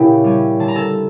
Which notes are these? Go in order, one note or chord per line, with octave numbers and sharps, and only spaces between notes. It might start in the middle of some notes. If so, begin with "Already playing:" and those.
Already playing: A#2 C#3 A#3 C#4 E4 G4 G5
G3 C#4
D3 A5
A#5
A4 A5